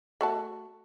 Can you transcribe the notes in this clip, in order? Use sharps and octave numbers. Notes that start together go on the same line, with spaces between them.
A3 F#4 A5